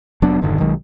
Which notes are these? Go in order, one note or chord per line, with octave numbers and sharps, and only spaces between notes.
F1 F#3 B3 D4
E1 G2 D3 D#3
B1 D#3 F#3 G#3